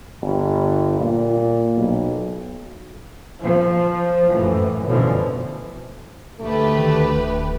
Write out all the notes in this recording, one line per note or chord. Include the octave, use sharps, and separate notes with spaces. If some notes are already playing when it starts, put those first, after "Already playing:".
G1
A#2
B1
F3
F#2 A2 E3
A1 F#2 B2 D3 E3 F3
D2 A3 G4 B4
D#3
D1